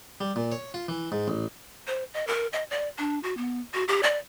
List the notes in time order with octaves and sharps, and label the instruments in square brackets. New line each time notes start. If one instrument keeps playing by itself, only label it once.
[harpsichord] G3
A#2
C#5
F4
E3
G#2
A1
[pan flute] C5
D#5
A#4
D#5
D5
D4
F#4
B3
F#4
G4
D5